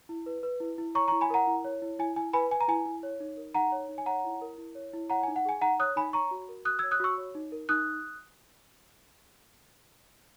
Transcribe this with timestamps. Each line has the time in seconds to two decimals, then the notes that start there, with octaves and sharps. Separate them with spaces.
0.09 E4
0.26 B4
0.43 B4
0.60 E4
0.78 E4
0.95 C#5 A#5 C#6
1.08 A#5 C#6
1.12 E4
1.21 G#5 B5
1.30 A#4 F#5 A#5
1.47 E4
1.64 C#5
1.82 E4
1.99 E4 G#5
2.16 E4 G#5
2.33 B4 G#5 B5
2.51 B4 G#5
2.61 A#5
2.68 E4 G#5
2.86 E4
3.03 C#5
3.20 D#4
3.37 A#4
3.54 D#4 F#5 A#5
3.72 C#5
3.89 D#4
3.98 G#5
4.06 C#5 F#5 A#5
4.24 E4
4.41 A#4
4.58 E4
4.75 C#5
4.93 E4
5.10 C#5 F#5 A#5
5.23 G#5
5.28 D#4
5.36 F#5
5.45 G#4 G#5
5.61 D#4 F#5 A#5
5.80 C#5 D#6 F#6
5.96 D#4 G#5 B5
6.13 C#5 A#5 C#6
6.31 F#4
6.49 A#4
6.65 F#4 D#6 F#6
6.79 E6 G#6
6.83 C#5
6.91 D#6 F#6
7.00 F#4 C#6 E6
7.18 C#5
7.35 D#4
7.52 A#4
7.69 D#4 D#6 F#6